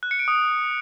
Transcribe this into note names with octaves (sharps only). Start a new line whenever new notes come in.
F#6
C#7
D7
D#6